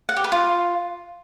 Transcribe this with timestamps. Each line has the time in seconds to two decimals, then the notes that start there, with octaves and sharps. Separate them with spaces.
0.09 F#5
0.16 G4
0.24 B4
0.32 F4